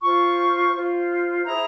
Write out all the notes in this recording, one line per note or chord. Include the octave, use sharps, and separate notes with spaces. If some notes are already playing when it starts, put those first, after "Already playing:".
F4 C5 C#6
F4 C5
E4 G#4 C5 A#5